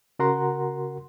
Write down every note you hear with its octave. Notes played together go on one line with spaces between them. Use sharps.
C#3 F#4 A#4 F#5 A#5 C6